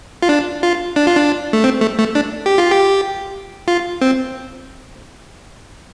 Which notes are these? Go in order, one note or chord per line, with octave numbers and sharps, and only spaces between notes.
F4
D4
F4
D4
F4
D4
A3
C4
A3
A3
D4
G4
F4
G4
F4
C4